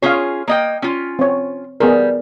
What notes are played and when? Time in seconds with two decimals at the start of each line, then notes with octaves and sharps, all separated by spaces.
0.02 C#4 F4 G#4 C#5 F5
0.48 A#3 D#5 G5
0.82 C#4 F4
1.19 C4 C#5
1.80 G3 B3 G#4 A#4